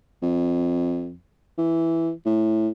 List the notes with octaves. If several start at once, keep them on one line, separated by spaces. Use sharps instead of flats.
F2
E3
A2